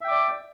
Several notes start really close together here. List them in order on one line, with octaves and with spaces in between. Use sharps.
E5 G5 D6 D5